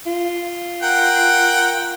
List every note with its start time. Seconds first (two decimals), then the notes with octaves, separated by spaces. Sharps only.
0.06 F4
0.83 A#4 F#5 G5